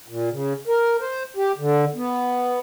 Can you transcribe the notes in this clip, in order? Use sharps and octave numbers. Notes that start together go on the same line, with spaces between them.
A#2
C#3
A#4
C5
G4
D3
B3